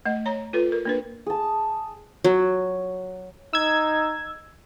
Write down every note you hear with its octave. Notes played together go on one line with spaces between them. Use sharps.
A3 D#5
C#5 A#5
F4 A4 B4
A#4
A#3 D4 B4
G#4 A5
F#3
D#4 E6 G#6